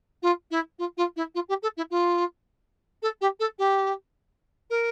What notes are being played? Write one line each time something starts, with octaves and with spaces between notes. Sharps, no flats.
F4
E4
F4
F4
E4
F4
G4
A4
E4
F4
A4
G4
A4
G4
A#4